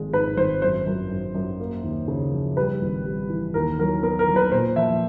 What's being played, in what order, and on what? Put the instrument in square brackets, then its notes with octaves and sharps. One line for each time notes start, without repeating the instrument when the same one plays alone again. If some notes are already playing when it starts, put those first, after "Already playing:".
Already playing: [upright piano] G#1 F3 G#3
G#2 B4
G#1 C5
F#2 C5
F#2
F#2
F#2
A#3
D#2
C#3
F3
G3 B4
G#1
G3
E3
D#2 A#4
F#3 A#4
B3 A#4
A#4
F#3
B4
A#2 C5
F3 E5